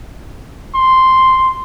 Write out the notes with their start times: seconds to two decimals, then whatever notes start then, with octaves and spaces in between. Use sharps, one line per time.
0.75 C6